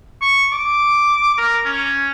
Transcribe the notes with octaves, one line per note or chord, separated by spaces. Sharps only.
C#6
D6
A#4
C#4